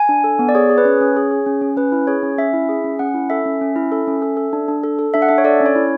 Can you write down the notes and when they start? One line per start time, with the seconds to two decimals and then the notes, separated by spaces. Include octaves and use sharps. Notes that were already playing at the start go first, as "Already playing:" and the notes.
Already playing: G#5
0.09 D4
0.24 A4
0.39 B3
0.49 D5
0.55 G#4 C#5
0.70 G#4
0.78 B4
0.85 C#4 C#5
1.01 C#4
1.16 G#4
1.31 G#4
1.46 C#4
1.61 C#4
1.77 C#4 B4
1.92 E4
2.07 G#4 C#5
2.23 C#4
2.38 C#4 E5
2.54 E4
2.69 G#4
2.84 C#4
2.99 C#4 F#5
3.14 E4
3.30 A4 E5
3.46 C#4
3.61 C#4
3.76 E4
3.92 A4
4.07 C#4
4.22 A4
4.37 A4
4.53 D4
4.68 D4
4.84 A4
4.99 A4
5.14 D4 E5
5.22 F#5
5.29 D4 E5
5.38 C#5
5.44 A4 D5
5.60 C#4
5.66 C#5
5.75 E4